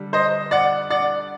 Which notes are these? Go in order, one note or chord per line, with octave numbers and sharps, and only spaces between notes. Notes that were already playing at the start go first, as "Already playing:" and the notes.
Already playing: D3 G3
C5 D#5
D5 F#5
D5 F#5